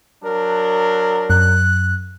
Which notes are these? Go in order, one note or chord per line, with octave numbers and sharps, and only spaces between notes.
F#3 D4 A#4
F#2 F#6